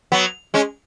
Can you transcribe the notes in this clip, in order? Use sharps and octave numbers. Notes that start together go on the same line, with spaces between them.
F#3 B3
G#3 C#4